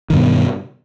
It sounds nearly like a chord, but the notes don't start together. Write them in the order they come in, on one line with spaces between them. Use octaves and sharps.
D#3 G2 B2